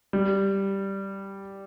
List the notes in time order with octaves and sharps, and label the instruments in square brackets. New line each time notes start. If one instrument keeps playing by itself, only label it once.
[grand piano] G3